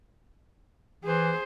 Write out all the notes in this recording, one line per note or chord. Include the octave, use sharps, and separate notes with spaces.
E3 G#4 C5